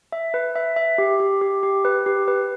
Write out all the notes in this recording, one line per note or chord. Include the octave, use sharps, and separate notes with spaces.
E5
B4
E5
E5
G4
G4
G4
G4
B4
G4
B4